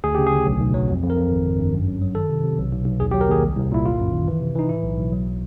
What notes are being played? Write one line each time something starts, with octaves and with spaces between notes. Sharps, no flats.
D2 G#4
C#3 G4
G#4
D2
B1
B1
F#3
F2
F2
A#4
F2
G#1
G#1
G2
F#2
F#2
F#3
D#3 A4
C3
C3
B1
B1
B1
D#2 G#4
G4
F#3
A#4
D#2 G#4
C2
C2
A#2 E4
G1 F4
F#2
D#3
E3
C3
E3 D#4
A2 E4
B1
B1
F#3